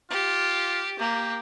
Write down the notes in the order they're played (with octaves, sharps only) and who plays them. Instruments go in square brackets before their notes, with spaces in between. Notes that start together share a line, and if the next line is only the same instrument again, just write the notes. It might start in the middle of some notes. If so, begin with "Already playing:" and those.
[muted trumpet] F4 [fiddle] G4
[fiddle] A#3 [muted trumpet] G4